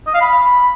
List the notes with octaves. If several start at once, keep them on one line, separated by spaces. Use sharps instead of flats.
D#5
F5
B5